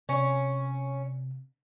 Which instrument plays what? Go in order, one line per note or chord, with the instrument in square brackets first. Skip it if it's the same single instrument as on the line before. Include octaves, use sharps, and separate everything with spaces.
[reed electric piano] C3 [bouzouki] C#4